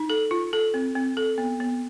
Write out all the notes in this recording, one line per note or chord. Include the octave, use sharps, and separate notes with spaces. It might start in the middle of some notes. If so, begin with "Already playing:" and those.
Already playing: D#4
A4
F4
A4
C4
C4
A4
B3
B3